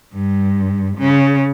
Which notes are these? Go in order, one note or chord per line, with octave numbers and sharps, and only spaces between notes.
G2
C#3